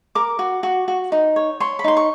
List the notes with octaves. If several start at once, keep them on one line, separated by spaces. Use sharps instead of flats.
A#4 D6
F#4
F#4
F#4
D#4
C#5
C#5 C6
B5
D#4 C6
C#6